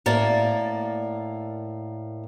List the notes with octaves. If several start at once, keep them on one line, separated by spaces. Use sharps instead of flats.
A2 A#3 D5